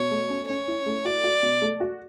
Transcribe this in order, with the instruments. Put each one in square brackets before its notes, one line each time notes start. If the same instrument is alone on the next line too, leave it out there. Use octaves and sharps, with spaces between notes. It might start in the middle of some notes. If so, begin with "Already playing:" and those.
Already playing: [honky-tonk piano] B2 [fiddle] C#5
[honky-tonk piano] A3
C#4
[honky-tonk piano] C#4 [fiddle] C#5
[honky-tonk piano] E4
A3
[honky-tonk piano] F#4 [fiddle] D5
[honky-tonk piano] F#4
B2
A3
F#4